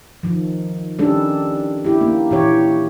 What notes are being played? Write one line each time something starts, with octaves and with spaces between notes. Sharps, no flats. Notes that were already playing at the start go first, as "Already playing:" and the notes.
D#3 F3
D#3 G3 C#4 D4 A4
E4 G4
A#3
A#2 E3 G4 C#5